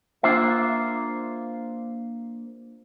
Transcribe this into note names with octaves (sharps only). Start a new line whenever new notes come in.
A#3 D4 F4 C5 E5